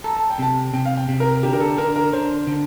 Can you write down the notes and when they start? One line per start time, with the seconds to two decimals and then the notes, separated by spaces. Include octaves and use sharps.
0.04 A4 A#5
0.17 A5
0.30 G5
0.39 C3 A5
0.74 C3 G5
0.85 F5
0.97 G5
1.09 C3
1.20 A#4
1.43 D3 G4
1.53 A#4
1.60 A4
1.78 D3 A#4
1.96 A#4
2.13 D3 C5
2.47 D3